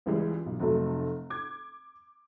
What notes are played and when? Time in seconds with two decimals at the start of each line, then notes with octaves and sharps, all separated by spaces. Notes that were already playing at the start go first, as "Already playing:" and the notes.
0.06 C#2 E3 G3 G#3
0.46 B1
0.60 F1 F#3 A3 A4
1.30 D6 G#6